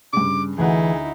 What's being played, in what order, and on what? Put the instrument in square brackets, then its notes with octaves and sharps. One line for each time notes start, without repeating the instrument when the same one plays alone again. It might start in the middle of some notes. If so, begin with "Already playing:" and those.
[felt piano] G2 C#3 [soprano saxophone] D6
[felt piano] D2 D3 F#5 [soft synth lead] E3 [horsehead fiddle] D#4 E4 [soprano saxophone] G#4